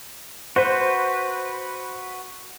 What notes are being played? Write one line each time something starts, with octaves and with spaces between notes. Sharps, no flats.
F#4 B4 C5